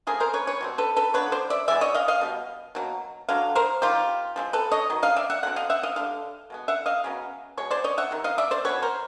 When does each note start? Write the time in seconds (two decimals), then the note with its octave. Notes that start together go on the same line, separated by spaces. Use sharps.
0.07 F3 A3 C4 G#4 A#4
0.20 A#4 C5
0.34 B4 C#5
0.47 B4 C#5
0.61 B2 G3 C4
0.78 A4 B4
0.96 A4 B4
1.14 D3 F3 B3 B4 C#5
1.32 C5 D5
1.50 D5 E5
1.68 E3 G#3 B3 D5 E5
1.81 C#5 D#5
1.95 D#5 F5
2.08 D#5 F5
2.21 B2 G3
2.75 B2 F#3 A#3
3.29 D3 F#3 F5
3.55 A#4 C5
3.82 D#3 G3 C4 F4 G4
4.36 F3 G#3 C4
4.53 A4 B4
4.71 C#5 D#5
4.90 D#3 F#3
5.03 D#5 F5
5.16 D5 E5
5.30 E5 F#5
5.43 D3 F#3 C4 F#5
5.56 D#5 F5
5.70 E5 F#5
5.83 D#5 F5
5.96 D3 G3 F5
6.50 B2 G#3 B3
6.68 E5 F#5
6.86 D#5 F5
7.04 C#3 F#3 B3
7.57 B2 G#3 C#5
7.71 C5 D5
7.84 C#5 D#5
7.98 E5 F#5
8.11 C3 D#3
8.24 D#5 F5
8.38 D5 E5
8.51 C5 D5
8.65 B2 G3 B3 B4 C#5
8.82 A#4 C5